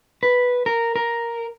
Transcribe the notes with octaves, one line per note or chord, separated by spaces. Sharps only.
B4
A#4
A#4